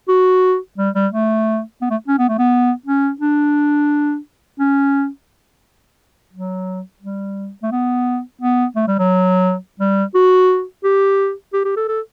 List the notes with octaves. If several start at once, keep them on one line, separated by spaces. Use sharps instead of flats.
F#4
G3
G3
A3
B3
A3
C#4
B3
A3
B3
C#4
D4
C#4
F#3
G3
A3
B3
B3
A3
G3
F#3
G3
F#4
G4
G4
G4
A4
A4